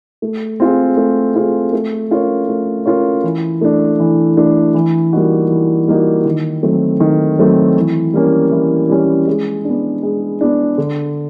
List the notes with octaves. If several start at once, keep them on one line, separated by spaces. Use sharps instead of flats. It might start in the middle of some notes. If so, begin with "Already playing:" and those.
A3
C4 F4 G#4
A3
C4 F4 G#4
A3
C#4 F4 A#4 C#5
A3
C#4 F4 A#4 C#5
E3
A3 D4
E3
A3 D4
E3
G3 A#3 D#4 F#4
E3
G3 A#3 D#4 F#4
D#3
F#3 A3 C4
D#3
F#3 A3 C4
E3
G3 A#3 C#4
E3
G3 A#3 C#4
G#3
B3 D4
G#3
B3 D4
D3